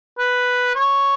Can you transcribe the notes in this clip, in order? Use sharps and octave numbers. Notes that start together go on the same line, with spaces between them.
B4
C#5